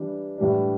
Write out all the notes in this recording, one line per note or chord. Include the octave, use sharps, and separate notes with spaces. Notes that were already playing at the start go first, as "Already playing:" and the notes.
Already playing: E3 G3 D4
A2 E3 G3 D4